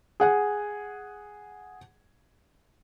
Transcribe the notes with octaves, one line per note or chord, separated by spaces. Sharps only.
G#4 F#5 G#5